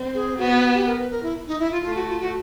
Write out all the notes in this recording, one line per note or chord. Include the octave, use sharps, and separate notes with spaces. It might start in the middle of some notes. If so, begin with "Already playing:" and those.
Already playing: C4
G#4
B3 F#4
F#4
G4
A#4
B4
A#4
E4
D#4
E4
F4
A3 F4
F#4
F4
F#4